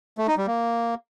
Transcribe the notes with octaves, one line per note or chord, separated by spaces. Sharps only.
A3
D#4
G3
A#3